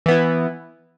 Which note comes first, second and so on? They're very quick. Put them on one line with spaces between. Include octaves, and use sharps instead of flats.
E3 B3 E4